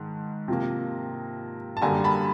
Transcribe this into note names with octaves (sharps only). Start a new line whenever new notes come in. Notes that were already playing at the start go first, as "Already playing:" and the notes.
Already playing: G#2 D#3 A5
C3 F3 A#3
A5
F#2 D3 G3 A#3 G#5 A#5
A5 B5